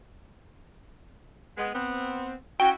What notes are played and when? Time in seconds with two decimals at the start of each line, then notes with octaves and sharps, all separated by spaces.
1.58 G#3 B3
1.73 B3 C4
2.60 C#4 E4 F#4 G5